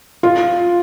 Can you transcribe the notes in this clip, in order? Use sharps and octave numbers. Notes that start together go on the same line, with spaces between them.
F4